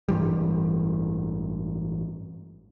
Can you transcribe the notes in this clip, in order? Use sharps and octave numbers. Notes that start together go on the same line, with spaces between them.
A1 G2 E3 G3